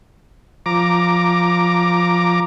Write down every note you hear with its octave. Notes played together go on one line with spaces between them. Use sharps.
F3 A#5 D6